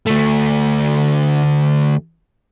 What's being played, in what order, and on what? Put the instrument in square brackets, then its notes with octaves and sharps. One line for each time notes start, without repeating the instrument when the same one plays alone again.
[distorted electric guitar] D2 A3